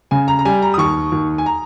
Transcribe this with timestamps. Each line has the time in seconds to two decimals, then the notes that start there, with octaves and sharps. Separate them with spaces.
0.11 C#3 G#5
0.28 A#5
0.39 A#5
0.45 G3 G#5
0.62 A#5
0.74 D#6
0.78 D#2 C#6
1.12 D#2
1.38 G#5
1.46 A#5